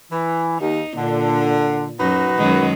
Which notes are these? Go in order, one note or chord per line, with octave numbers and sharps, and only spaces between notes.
E3
D#2 D#4
A#2 D3
F#2 D#4 F#4 B4
F#2 D#3 G#3